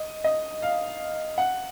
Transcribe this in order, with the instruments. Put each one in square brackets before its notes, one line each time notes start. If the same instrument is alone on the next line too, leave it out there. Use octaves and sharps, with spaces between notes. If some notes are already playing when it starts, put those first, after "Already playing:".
Already playing: [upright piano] D#5
D#5
F5
F#5